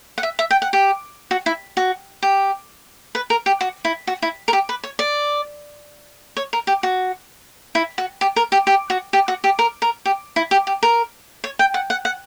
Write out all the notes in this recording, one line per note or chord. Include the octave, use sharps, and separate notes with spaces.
F#5
E5
E5
G5
F#5
G4
F#4
E4
F#4
G4
B4
A#4
G4
F#4
E4
F#4
E4
A#4
G4
B4
C#5
D5
C#5
A#4
G4
F#4
E4
F#4
G4
A#4
G4
G4
F#4
G4
F#4
G4
A#4
A#4
G4
E4
G4
G4
A#4
C#5
G5
F#5
F#5
F#5